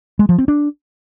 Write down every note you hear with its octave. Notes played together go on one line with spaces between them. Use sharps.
G#3
F3
C4
D4